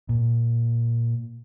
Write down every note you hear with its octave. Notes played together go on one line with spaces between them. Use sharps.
A#2